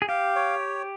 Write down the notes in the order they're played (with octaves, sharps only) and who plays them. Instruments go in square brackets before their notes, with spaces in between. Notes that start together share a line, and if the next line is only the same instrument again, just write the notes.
[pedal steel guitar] G#4
[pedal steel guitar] G4 [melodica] F5
[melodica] C#5